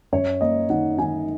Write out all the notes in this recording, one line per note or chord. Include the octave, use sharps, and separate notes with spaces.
F#2 C#5
A#3 D#5
D#3 F#5
D#3 G#5